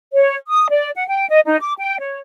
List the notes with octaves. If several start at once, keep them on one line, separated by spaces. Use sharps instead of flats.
C#5
D#6
D5
F#5
G5
D#5
D#4
D6
G5
C#5